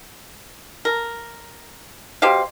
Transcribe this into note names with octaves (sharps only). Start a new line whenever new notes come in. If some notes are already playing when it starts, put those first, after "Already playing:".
A#4
B2 G4 C5 F5